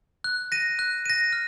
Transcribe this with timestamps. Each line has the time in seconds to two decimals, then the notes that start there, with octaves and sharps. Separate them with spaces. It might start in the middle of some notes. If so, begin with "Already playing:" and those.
0.24 F#6
0.52 A#6 D#7
0.79 F#6
1.06 A#6 D#7
1.33 F6